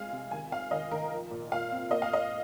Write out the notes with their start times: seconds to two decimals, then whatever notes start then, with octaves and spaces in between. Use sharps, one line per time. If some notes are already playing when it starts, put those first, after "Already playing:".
Already playing: G#3 C4 F5 G#5
0.12 C3
0.31 D#3 G#5
0.51 C4 F5
0.71 D#3 D#5
0.91 D#3 A#4
1.12 F3
1.31 A#2
1.52 A#2 F5
1.72 C4
1.91 A#3 D#5
2.02 F5
2.12 A#3 D#5